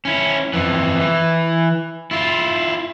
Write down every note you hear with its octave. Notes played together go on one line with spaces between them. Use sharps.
C#4 E4
F2 E3
E3
E4 F4